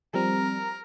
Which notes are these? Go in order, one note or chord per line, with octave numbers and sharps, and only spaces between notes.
F3 G3 C4 A#4